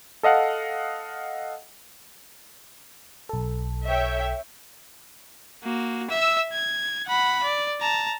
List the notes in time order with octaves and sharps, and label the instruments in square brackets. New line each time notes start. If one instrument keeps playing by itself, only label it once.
[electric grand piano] A4 D#5 F5 F#5
[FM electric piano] B1 A4
[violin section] C#5 E5 G5
[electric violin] A#3 F#4
E5 E6
G#6
F#5 B5
D5
A5 A#5